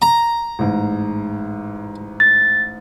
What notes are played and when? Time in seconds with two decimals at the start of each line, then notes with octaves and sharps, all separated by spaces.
0.02 A#5
0.59 A1 G#2
2.20 A6